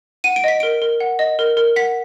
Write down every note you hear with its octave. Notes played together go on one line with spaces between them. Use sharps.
F#5 D#7
D7
D#5 B6
A#4 D7
A#4
F#5
D#5
A#4
A#4
F#5 B6